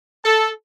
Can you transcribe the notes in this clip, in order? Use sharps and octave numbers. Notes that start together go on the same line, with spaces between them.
A4